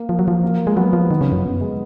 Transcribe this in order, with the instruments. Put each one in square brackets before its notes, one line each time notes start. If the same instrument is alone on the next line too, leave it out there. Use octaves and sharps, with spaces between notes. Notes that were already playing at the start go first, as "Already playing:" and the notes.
Already playing: [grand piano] A#3
[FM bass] F3
F#3
F3
[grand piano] A#3
[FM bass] G#3
[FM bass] F#3 [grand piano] B3
[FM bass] F3
D#3
C#3
F#2
[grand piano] B3
G#3